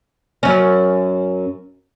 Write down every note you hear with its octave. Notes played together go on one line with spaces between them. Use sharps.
F#2 C#4